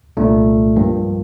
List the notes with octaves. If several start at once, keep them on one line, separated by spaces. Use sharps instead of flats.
C2 A#2 A3 D4
G2 F3 A#3